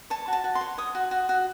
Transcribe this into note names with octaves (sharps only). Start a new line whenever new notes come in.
C#5 A5
F#4 A5
F#4
C6
C#5
C#5 D#6
F#4
F#4
F#4